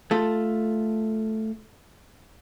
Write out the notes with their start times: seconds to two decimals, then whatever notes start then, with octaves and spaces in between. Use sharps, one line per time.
0.11 A3 F4 A4